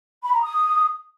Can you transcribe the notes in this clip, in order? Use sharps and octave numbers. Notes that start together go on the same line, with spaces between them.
B5
A#5
D#6